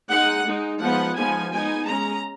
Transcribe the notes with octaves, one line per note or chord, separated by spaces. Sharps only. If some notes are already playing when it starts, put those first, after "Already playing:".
G#3 D#4 F#5
G#3 D#4
F3 G#3 B3 D#4 F#5
F3 G#3 B3 D#4 G#5
G#3 B3 D#4 G#5
G#3 C#4 A#5